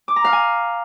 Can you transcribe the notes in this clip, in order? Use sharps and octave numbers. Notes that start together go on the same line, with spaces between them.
D6
A#5
F5
G#5